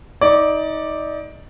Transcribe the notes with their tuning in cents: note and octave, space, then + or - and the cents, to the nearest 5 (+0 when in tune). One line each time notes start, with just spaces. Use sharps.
D#4 +25 D5 +0